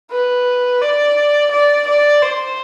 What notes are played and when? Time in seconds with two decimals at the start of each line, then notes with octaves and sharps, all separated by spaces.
0.11 B4
0.82 D5
1.51 D5
1.87 D5
2.22 C5